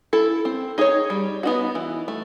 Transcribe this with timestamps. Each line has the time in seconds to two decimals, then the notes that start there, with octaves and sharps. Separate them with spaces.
0.13 E4 A4
0.45 C4
0.78 D#4 G#4 C#5
1.10 G3
1.43 B3 D#4 F#4
1.75 E3
2.08 A3